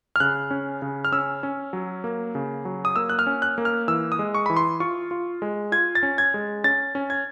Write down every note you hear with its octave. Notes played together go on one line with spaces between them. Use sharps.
F6
C#3 F#6
C#4
C#3
F6
C#4 E6
C#4
F#3
A#3
C#3
F#3
D#6
A#3 E6
F#6
F6
C#4
F#6
A#3
F6
E3 E6
D#6
G#3
C#6
E3 B5
C6
F4 C#6
F4
G#3
F4 G#6
A6
C#4
G#6
G#3
C#4 A6
C#4
G#6